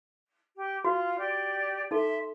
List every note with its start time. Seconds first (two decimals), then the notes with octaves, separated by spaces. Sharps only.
0.56 G4
0.85 F4 F#4
1.17 G4 D5
1.91 D#4 A4 E5 C6